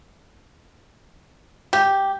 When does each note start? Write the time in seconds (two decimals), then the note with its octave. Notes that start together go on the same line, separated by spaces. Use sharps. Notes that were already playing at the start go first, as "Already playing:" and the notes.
1.73 G4 G6